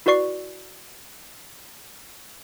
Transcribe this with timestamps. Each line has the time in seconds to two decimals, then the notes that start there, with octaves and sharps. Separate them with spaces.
0.06 E4 F#4 B4 D5 C#6 C7